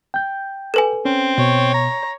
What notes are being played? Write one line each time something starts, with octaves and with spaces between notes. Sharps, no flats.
G5 G6
A4 B4 G#5
C4 C#4
B2 C#5
A#5